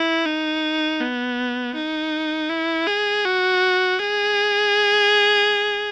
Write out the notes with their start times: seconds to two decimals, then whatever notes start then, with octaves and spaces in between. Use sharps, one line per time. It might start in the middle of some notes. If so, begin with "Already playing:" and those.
Already playing: E4
0.26 D#4
1.01 B3
1.75 D#4
2.50 E4
2.87 G#4
3.25 F#4
3.99 G#4